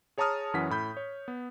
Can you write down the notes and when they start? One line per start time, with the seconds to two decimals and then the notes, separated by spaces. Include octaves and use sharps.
0.18 G#4 C#5 A5 A#5 D#6 F6
0.54 F#2 E3 C#4 F#5 B6
0.70 A2 B5 G6
0.97 C#5
1.28 B3